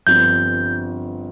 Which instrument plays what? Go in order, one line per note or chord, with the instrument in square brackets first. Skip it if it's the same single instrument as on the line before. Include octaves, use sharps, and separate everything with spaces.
[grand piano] G1 G2 F3 C4 [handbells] G6